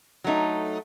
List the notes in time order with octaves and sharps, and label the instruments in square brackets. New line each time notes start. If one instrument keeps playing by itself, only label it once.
[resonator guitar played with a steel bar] F#3 A3 D#4